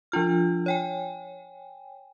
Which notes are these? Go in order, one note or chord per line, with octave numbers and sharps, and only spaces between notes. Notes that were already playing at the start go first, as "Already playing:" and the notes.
F3 D4 F4 F6
C#5 G5 G#5